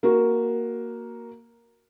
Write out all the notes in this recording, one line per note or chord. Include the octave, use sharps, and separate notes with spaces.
A#3 F#4